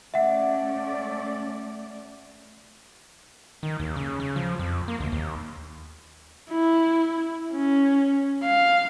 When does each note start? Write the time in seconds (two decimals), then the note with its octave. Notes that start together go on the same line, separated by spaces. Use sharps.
0.14 A3 C#4 D5 E5 F#5
3.63 D#3
3.80 D#2
3.96 C#3
4.20 C#3
4.36 F3
4.59 F2
4.88 A#3
5.00 D2
5.12 D#2
6.51 E4
7.53 C#4
8.44 F5